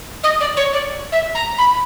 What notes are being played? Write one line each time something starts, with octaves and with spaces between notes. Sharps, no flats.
D#5
D5
C#5
D5
E5
A#5
B5